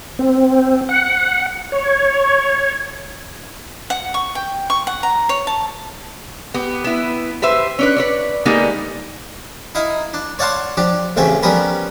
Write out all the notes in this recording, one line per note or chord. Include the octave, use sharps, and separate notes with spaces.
C4
F#5
C#5
F#5
C#6
G5
C#6
F#5
A#5
C#5
A5
B3 G4
B3 E4
G4 B4 C5 E5
C#4 D4 B4
B4 C#5 D5
D3 G3 G#3 A#3 B3 D#4
D#4 E4 F5
D4
C#5 D5 F5 F#5 A5 C6
F3 D4 G4
A1 C#3 A3 C4 C#4 E5
F3 G3 B3 C#4 A#4 B4